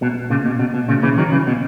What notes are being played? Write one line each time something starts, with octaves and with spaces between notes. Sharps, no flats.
B2
A#2 C#3
B2
B2
B2
A#2 C#3
C#3 E3
D#3 F#3
C#3 E3
B2